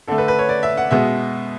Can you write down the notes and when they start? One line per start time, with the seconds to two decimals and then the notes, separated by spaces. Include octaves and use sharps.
0.07 D3 A3 A4
0.18 B4
0.28 B4
0.39 C#5
0.49 D5
0.63 E5
0.77 F#5
0.91 B2 G#3 B3 E5